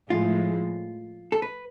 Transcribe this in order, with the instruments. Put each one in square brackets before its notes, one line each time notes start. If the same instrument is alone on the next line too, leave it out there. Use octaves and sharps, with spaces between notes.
[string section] A2 F3 G#3 [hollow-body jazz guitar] F4
[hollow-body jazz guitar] A4
B4